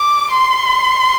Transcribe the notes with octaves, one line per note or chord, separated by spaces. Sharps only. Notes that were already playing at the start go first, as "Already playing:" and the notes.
Already playing: D6
C6